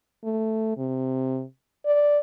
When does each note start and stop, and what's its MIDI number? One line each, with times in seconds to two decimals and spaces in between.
0.24 0.77 57
0.77 1.43 48
1.86 2.19 74